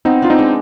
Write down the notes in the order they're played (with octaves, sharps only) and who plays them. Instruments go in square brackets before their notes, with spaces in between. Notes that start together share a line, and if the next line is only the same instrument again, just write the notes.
[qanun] B3 [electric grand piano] C4 D#4
[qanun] D4 [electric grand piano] F4
[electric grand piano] C4 D#4
[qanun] G#3